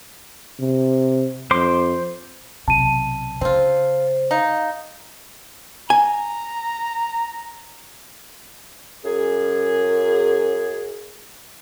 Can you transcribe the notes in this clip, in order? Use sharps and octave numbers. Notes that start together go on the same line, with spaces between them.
C3
F2 C5 C6 D6
B1 C3 A5 D#7
C#3 C4 F4 C5
D#4 F5
G#5 A#5
F#2 G#4